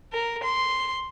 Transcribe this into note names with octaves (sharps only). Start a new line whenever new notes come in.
A#4
C6